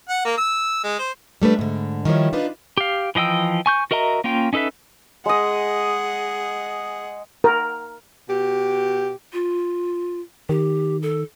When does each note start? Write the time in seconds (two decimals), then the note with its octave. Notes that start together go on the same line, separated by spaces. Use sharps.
0.09 F#5
0.25 A#3
0.37 E6
0.83 G#3
0.98 C5
1.42 G3 A3 D4 B4
1.59 G#2 D3
2.05 D#3 F3 G3 E4 C#5
2.33 D4 D#4 F4 B4
2.77 G4 F5
3.15 E3 F3 D#5 G5 E6
3.66 G#5 C#6 G6
3.91 F#4 A#4 D#5 E5 A#5
4.24 A#3 C#4 F4 G5
4.53 C#4 D#4 A4 B4 E5
5.26 G#3 G#4 D#5 F#5
7.44 A#4
8.29 B2 G4
9.33 F4
10.49 D#3 G4
11.02 A4